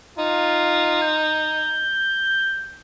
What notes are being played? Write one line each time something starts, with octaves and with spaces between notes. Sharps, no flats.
D#4 F4
G6